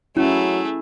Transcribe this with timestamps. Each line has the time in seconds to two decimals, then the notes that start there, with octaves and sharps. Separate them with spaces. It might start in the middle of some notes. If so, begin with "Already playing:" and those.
0.17 F#3 A3 C#4 E4 G#4